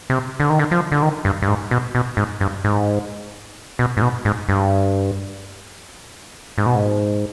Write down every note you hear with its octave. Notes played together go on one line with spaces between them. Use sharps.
C3
D3
D#3
D3
F3
D3
D#3
G2
G2
G#2
B2
B2
G#2
G2
G#2
B2
G#2
B2
G#2
G2
G#2
B2
G#2